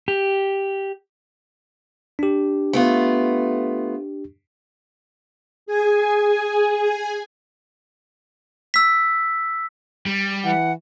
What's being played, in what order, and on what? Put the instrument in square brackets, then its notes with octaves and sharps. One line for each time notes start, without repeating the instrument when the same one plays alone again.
[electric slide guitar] G4
[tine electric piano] D4 G4
[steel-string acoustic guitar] A3 B3 F4
[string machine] G#4 G#5
[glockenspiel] E6 B6
[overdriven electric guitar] G3
[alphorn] E3 [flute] F#5